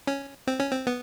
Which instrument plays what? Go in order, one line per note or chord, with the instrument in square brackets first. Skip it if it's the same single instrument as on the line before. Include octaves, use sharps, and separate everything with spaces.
[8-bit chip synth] C#4
C4
C#4
C4
B3